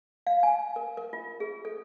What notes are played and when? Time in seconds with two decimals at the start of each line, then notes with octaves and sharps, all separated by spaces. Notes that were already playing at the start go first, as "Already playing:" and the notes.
0.27 F5
0.43 G#5
0.76 A#4
0.97 A#4
1.13 F4
1.40 G#4
1.65 A4